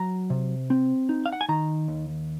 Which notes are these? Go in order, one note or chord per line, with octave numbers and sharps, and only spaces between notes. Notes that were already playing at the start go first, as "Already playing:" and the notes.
Already playing: F#3 A#5
C3
C4
D#4
F5
F#5
G#5
D#3 A#5
D#2